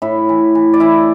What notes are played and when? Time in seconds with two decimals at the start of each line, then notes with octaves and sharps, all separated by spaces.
0.02 A2 E4 E5
0.29 E3
0.55 E3
0.73 D5
0.80 E3 E4 E5